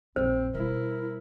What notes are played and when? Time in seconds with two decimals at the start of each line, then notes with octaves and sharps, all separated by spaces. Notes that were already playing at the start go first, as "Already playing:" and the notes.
0.16 A#1 F#2 C4 C5
0.54 B2 G3 E4 A#4